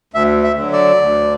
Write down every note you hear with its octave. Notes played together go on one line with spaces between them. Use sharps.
D2 E5
E5
D3 F#3
D5
D2